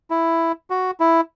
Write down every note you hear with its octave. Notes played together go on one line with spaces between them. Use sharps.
E4
F#4
E4